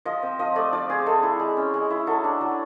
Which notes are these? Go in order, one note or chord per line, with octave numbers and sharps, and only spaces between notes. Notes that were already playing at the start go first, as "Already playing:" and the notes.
F3 D#5
C4
F3 D#5
A3 D5
F3 D5
C4 G#4
G#3 A4
E4
G#3
C#4
G#3
E4
F#3 A4
D4
F#3